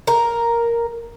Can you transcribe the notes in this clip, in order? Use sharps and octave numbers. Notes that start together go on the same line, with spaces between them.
A#4